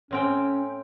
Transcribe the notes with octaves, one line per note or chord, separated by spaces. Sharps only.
A2 C4 C#4 G5